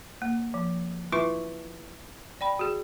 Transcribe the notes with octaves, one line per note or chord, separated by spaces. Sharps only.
A#3
F3
E4 F4 B4 E5 C#6
D5 G5 B5
F#4 G#4